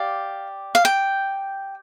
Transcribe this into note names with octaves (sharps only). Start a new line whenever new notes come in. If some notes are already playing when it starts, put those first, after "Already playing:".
Already playing: G4 D5 F5
F5
G5